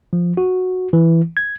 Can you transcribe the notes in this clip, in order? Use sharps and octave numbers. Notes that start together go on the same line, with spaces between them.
F3
F#4
E3
G#6